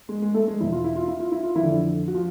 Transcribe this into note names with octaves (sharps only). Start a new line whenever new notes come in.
G#3 G#4
G#3 G#4
A3 A4
G#3 G#4
E2 B2 E4
F4
E4
F4
E4
F4
E4
F4
E3 E4
F2 D3
F#4
F3 F4